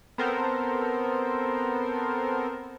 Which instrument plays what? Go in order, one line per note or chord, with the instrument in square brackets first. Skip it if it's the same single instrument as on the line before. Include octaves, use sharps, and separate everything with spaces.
[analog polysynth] B3 C4 A4 A#4 C5